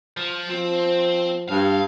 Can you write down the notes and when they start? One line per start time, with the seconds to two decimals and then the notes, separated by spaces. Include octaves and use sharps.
0.17 F3
0.49 F3 C4
1.49 G2 F5